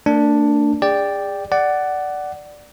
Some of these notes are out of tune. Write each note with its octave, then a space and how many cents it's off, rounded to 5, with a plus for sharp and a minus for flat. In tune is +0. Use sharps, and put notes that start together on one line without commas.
A3 +40 D4 +0 A#4 +0
G#4 -35 D5 +0 G5 +0
D5 +0 F#5 +15